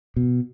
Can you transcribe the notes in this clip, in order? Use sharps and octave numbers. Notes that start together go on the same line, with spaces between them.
B2